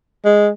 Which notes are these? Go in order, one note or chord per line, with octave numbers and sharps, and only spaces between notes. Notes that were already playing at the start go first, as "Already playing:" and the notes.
G#3